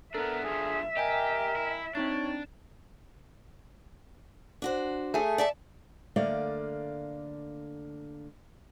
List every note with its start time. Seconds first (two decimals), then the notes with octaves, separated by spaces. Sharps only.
0.15 B3 D4 A4 A#4 E5
0.44 G2 F3 G#4
0.97 G4 A#4 D#5 G5 G#5
1.56 E4
1.95 C4 D4 D#4 C#5 A6
4.62 D4 F#4 C5
5.14 A3 G#4
5.38 D5 E5 A5
6.16 D3 A3 A#3 D5 F5